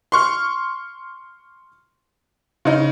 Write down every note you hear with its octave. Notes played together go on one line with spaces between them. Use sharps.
C6 C#6 F6
C#3 D#4